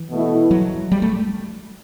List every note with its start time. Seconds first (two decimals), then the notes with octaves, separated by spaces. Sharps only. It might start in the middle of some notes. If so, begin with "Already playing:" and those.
Already playing: E3
0.10 B2 A3 E4
0.51 F#3
0.92 G3
1.02 A3